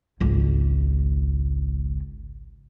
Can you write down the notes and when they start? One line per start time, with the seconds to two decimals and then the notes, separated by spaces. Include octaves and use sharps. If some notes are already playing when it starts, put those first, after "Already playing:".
0.20 G#1 C#2